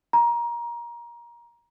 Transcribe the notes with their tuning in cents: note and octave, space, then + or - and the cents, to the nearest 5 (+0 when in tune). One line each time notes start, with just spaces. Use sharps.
A#5 +25